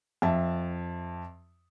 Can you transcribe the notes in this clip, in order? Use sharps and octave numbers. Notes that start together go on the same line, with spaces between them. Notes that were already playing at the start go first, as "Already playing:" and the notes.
F2 E5 A5